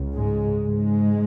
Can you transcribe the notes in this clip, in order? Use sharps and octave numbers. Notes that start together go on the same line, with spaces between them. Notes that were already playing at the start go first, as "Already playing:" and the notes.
Already playing: C#2 C#3
G#2 G#3
G#2 G#3